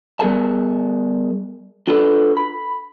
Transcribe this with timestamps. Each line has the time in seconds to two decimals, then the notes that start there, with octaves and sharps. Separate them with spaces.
0.20 G3 B3 G#4 A#4 A5
1.87 D4 F4 F#4 A4 B4
2.37 B5